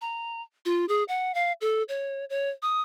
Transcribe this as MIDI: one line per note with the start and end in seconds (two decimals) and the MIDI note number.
0.01 0.42 82
0.65 0.85 65
0.89 1.03 68
1.08 1.34 78
1.34 1.52 77
1.61 1.83 69
1.89 2.25 73
2.30 2.50 73
2.62 2.82 87